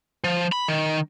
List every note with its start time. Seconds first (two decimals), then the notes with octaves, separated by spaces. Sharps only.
0.24 F3
0.52 B5
0.68 D#3